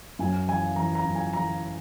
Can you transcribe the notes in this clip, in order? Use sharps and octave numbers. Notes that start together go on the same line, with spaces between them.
F#2 G#5
E3 G#5
E3 A#5
A#5
F#2
G#5
E3 A#5